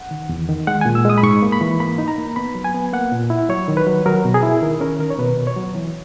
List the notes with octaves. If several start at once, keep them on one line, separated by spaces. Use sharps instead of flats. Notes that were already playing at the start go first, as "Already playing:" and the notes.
Already playing: F#5
D#3
E2
D#3
G#3 F#5
A#2 G#5
E6
G#3 D#6
B5
G#2 C#6
A#3
B5
E3
A#3 B5
D#4
A#5
A#3
B3 B5
F#3
G#5
B3
A#3 F#5
A#2
E4
F#3 C#5
D#3
B4
F#3
F#3 A#4
B2
G#4
E4
D#3 A#4
C#4 A#4
D#3 A#4
C#5
B2 B4
B2
C#5
F#3
E3